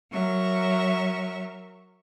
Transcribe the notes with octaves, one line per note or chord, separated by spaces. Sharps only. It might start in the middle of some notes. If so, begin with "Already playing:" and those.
F#3 A#4 E5 C#6